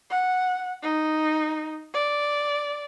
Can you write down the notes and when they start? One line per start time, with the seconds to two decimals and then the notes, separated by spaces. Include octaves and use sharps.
0.11 F#5
0.83 D#4
1.94 D5